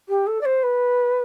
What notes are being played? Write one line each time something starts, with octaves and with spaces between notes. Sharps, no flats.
G4
A4
D5
C5
B4